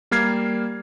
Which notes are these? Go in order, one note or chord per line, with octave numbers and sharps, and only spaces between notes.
G3 A#3 F6 G#6 C7